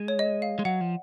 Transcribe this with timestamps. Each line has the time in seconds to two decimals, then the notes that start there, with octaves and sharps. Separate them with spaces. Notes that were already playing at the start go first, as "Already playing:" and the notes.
Already playing: G#3
0.08 C#5
0.19 D#5
0.42 F5
0.59 G#3
0.65 F#3 F#5
0.81 F3